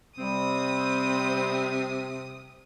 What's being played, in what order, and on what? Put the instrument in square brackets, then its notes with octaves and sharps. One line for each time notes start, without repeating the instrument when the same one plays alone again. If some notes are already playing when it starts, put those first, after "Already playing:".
[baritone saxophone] C3 [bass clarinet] G3 [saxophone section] C4 [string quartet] D#6